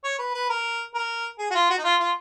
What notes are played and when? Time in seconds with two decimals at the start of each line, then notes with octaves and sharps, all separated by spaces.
0.04 C#5
0.19 B4
0.35 B4
0.50 A#4
0.95 A#4
1.39 G#4
1.51 F#4
1.55 F4
1.70 F#4
1.79 D#4
1.84 F4
2.00 F4